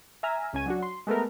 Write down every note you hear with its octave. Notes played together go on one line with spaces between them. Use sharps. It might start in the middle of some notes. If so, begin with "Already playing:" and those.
E5 G#5 A#5 F6
C#2 C#4 G#5 D#7
F#3 D4 F#4
C6
G#3 A3 B3 A#4